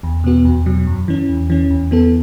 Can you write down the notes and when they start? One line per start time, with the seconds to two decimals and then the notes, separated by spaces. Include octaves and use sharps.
0.03 E2
0.24 B2 B3 F#4
0.45 E2
0.66 B2 F#3
0.87 F#2
1.08 E3 C#4
1.29 E2
1.50 E3 C#4
1.70 E2
1.91 E3 B3 A4